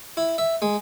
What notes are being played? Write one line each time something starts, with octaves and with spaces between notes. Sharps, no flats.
E4
E5
G#3